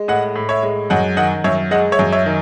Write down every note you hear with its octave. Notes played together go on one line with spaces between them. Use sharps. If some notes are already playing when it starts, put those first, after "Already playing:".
Already playing: G#3
A2 D#5 F#5
A2
C#5 E5
G#3
F#2 D#5 F#5
D#3 D#5 F#5
F#2 C#5 E5
G#3 D#5 F#5
C#5 E5
F#2
C#5 E5
D#3